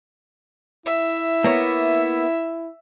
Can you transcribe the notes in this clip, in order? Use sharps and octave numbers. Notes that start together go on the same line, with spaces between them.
E4 E5
A#3 B3 C#5